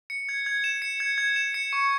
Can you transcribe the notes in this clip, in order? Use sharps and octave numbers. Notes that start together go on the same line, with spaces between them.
C#7
G#6
G#6
E7
C#7
G#6
G#6
E7
C#7
C#6